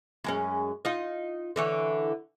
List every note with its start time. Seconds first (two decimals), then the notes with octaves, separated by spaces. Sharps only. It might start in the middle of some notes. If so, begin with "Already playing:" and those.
0.24 F#2 G#3 C#4
0.85 D#4 F4 D#5
1.56 D3 E3 C#5